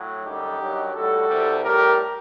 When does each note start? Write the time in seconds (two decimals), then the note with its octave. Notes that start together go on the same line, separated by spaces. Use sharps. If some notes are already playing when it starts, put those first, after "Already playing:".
Already playing: A2 F#3
0.25 F#2 D3 G3 D#4 G4
0.60 G2 D#3 F#3
0.95 A2 G3 F#4 A4
1.29 C2 C3 G3
1.64 A2 G3 G4 A#4